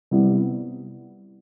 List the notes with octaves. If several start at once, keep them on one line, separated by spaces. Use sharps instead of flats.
C3 G3 B3 E4